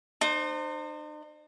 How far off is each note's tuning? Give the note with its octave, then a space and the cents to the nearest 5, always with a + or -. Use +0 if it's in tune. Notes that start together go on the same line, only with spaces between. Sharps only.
D#4 -45 C5 +0